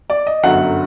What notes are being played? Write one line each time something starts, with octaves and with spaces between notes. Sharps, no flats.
D5
D#5
G1 F#2 D3 F#3 F#5